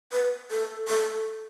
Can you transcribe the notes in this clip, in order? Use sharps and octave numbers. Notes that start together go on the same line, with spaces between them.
B4
A4
A4